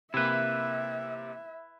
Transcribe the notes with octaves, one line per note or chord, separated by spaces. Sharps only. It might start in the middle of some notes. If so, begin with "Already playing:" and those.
C3 A#3 E4 B4 E5